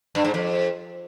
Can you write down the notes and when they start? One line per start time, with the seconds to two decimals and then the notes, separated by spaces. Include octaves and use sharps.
0.15 G2
0.24 G#2
0.34 F2